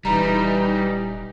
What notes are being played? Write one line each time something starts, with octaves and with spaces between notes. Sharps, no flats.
D#1 E3 G3 D#4 A#5 B5